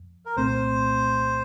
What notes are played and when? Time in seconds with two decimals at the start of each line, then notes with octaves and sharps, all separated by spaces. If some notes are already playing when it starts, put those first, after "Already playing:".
Already playing: F2
0.26 A#4
0.37 C2 A#2 A3 C4 C5